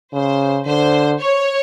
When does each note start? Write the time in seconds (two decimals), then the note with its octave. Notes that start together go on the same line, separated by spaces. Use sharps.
0.14 C#3 C5
0.67 D3 C5
1.19 C#5